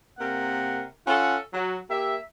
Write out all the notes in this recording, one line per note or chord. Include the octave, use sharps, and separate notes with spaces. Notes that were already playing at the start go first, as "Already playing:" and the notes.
C3 A#3 A#4 F#5
C#4 F4 A4 F#5
F#3
A#3 G4 E5